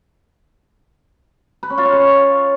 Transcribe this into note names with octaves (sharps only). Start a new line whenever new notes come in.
B4
C#4
F4
F5
C#5